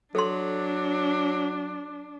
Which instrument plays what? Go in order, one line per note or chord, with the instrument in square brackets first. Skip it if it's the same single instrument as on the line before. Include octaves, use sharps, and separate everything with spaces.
[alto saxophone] F#3 [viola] D4 [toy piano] A4 C6